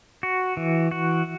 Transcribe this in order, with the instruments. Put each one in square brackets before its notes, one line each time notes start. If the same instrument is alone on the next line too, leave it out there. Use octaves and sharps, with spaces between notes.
[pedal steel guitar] F#4
E3
F#4